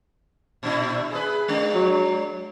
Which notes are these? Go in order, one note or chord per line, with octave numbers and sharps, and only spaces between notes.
A#2 D4 E4
G#4 B4
G#3 D4
F#3